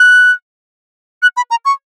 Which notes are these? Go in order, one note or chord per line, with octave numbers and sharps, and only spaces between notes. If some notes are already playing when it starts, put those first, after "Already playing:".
Already playing: F#6
F#6
B5
A#5
C#6